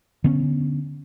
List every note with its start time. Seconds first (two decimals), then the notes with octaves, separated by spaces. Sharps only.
0.24 D3 B3 C#4